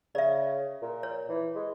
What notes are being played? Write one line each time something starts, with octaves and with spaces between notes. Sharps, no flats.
C#3 D5 E5
A#2
C#5
E3
G#3